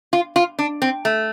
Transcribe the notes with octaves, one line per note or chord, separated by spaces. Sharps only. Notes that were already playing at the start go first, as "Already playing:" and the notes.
F4
F4
D4
C4
A3